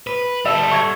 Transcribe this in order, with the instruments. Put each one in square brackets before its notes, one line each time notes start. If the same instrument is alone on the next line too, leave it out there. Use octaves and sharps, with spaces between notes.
[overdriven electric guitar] B4
[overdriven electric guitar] G3 A4 [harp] E5
[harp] C#6 G#6 A#6